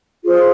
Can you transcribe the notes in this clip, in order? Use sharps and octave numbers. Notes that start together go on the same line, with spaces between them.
F4 G#4 C5